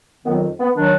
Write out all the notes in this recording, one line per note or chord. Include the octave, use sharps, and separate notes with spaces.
F2 D#3 F#3 B3
B3
D#3 F#3 D4